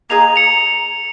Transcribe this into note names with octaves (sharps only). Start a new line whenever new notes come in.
A#3 D#4 G#4 D#5 F7
C#7 F7